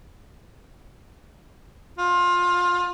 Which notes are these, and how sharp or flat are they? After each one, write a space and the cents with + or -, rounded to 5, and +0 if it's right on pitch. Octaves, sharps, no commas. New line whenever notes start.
F4 +20